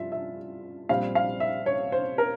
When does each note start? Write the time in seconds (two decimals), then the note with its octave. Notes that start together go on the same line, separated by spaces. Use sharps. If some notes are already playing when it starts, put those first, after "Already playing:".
Already playing: G2 F3 F4 E5
0.12 E5
0.89 A#1 A#2 G3 C4 F5
1.15 F5
1.40 E5
1.66 C#5
1.92 C5
2.18 A#4